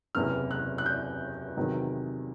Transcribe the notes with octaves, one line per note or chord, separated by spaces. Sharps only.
F#1 E2 C3 E3 F6
F#6
F#6
G6
E2 C3 D#3 F#3